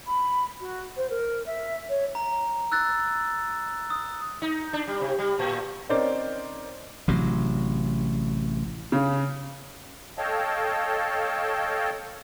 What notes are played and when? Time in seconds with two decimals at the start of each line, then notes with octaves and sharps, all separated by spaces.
0.06 B5
0.60 F#4
0.96 C5
1.09 A#4
1.46 E5
1.89 C#5
2.15 A#5
2.72 E6 F#6 A6
3.90 D#6
4.42 D#4
4.73 D4
4.87 G3
5.01 C3
5.18 G3
5.39 A2
5.89 C4 C#4 D#4 A#4 C5 D5
7.08 A1 C3 F#3
8.92 C#3
10.18 A4 C#5 D#5 F5 G5 A5